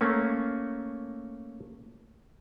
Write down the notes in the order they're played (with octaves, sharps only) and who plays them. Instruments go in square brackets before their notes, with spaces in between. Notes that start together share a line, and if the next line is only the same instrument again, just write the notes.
[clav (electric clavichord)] A3 A#3 C#4